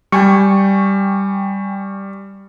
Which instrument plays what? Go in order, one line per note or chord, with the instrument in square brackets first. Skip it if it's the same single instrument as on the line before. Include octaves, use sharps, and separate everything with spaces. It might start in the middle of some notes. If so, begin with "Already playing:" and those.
[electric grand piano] G3 [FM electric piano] G5 G#5 C#6